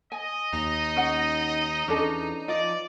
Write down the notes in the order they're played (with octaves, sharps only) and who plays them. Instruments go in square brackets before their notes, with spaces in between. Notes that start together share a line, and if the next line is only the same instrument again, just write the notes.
[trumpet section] D#5 [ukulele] G#5
[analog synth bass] D#2 [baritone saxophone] D#4
[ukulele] C#4 F#5
[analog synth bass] E2 [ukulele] C#4 D4 A4
[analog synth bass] F3 [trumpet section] D5 [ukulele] D#5